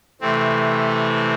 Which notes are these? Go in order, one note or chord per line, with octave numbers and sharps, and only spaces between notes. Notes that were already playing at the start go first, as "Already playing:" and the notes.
C3 E3 A3 C4